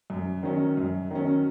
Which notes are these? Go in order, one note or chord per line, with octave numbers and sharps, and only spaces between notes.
F#2
D#3 F#3 C#4
F#2
D#3 F#3 C#4